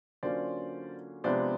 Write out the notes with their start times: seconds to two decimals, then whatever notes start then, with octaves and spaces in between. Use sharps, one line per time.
0.23 D3 F#3 A#3 C#4 F4 C5 D5
1.24 C3 F3 G#3 B3 D4 C5 D5